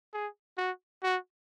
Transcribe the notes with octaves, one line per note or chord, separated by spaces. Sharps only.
G#4
F#4
F#4